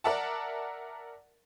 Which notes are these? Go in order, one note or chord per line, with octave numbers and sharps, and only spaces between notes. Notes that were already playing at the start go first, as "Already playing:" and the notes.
A#4 D5 E5 F#5 A5